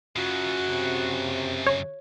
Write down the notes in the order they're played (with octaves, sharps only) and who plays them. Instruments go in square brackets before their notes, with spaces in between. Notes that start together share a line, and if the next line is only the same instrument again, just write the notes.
[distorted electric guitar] F#2 C#3 [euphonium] F4 [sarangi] F#4
[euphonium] C3
[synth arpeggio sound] C#5